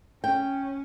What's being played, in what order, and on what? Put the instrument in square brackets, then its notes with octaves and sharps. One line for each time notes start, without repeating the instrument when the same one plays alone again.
[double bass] C#4 [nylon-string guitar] G5